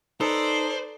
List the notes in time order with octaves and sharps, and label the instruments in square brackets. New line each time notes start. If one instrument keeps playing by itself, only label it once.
[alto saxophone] D#4 [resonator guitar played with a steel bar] A4 [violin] B4 D5 [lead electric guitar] C5